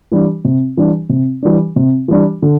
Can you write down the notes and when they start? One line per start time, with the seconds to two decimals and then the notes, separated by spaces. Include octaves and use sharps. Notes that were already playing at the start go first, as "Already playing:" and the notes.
0.12 E3 G3 D4
0.44 C3
0.77 E3 G3 D4
1.09 C3
1.43 E3 G3 D4
1.76 C3
2.08 E3 G3 D4
2.42 D3